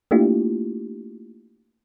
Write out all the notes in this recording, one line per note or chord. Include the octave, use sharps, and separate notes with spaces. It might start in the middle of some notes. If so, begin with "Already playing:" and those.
A3 A#3 D4 E4 F4 G4